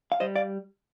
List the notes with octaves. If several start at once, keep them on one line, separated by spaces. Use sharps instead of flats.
F5
G3 C5 D#5
D5 F5